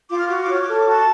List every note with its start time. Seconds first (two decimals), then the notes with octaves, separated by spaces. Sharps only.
0.10 F4 D6
0.19 F6
0.27 F#4 D6
0.35 F6
0.44 D6
0.48 C#5 F6
0.61 D6
0.67 A4 F6
0.77 D6
0.86 F#4 A5